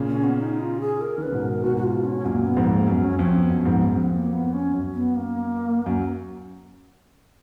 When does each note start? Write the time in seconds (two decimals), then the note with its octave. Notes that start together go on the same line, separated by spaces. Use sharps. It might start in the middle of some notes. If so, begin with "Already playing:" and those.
Already playing: A#2 C#3
0.08 C#4
0.24 B3
0.39 D#4
0.60 F4
0.81 G#4
1.01 A#4
1.18 D#3
1.22 C#3 B4
1.32 G#2 B2
1.42 A#4
1.64 G#2 B2 F#4
1.77 F#4
1.84 F4
2.04 C#4
2.25 F#2 A#2 A#3
2.46 B3
2.57 F2 G#2
2.67 A#3
2.88 F#2 B3
3.03 C#4
3.19 F2 C#4
3.34 B3
3.50 F#2
3.65 F2 G#2
3.81 F#2
3.96 F2
4.12 A#3
4.33 B3
4.53 C#4
4.74 F#2
4.95 B3
5.15 A#3
5.86 F#2